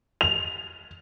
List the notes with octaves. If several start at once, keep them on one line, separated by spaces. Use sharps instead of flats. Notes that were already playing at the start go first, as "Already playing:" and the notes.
F7